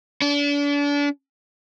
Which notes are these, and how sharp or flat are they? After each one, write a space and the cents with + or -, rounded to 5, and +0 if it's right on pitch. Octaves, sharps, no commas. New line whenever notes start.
D4 -35